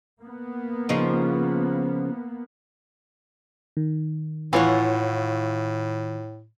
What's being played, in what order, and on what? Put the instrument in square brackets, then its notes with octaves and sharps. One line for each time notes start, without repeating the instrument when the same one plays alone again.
[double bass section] A#3 B3
[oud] C#3 F3 D#4
[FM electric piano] D#3
[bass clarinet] A2 [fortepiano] E3 [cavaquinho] F4 C#5 F#5